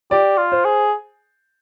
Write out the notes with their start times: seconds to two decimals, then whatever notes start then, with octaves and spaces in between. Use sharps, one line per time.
0.11 G4 D5
0.38 F4
0.52 C5
0.65 G#4